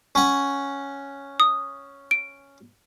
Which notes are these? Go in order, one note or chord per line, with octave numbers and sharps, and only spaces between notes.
C#4 F#5
D#6
D7